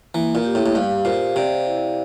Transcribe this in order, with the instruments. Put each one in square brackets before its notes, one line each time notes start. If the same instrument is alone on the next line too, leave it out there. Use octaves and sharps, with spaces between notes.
[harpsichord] E3 [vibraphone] A#3
[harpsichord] A#2
[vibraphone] G4
[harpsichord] A2
A2
[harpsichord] G2 [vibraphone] F5
[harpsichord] A#2 [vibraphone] C5
[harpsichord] C3 [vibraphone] D5
[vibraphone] E4